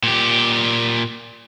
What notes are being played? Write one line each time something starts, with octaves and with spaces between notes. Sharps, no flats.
A#2 G4